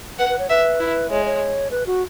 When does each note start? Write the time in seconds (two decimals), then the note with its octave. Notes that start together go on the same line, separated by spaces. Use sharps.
0.19 B4 F#5
0.29 B4
0.39 C#5
0.50 B4 E5
0.80 E4
1.10 G#3 C#5
1.26 C#5
1.71 B4
1.87 F#4